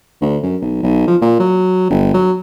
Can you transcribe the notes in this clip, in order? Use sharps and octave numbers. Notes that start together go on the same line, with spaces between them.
D2
F#2
B1
B1
F3
A#2
F#3
G1
F#3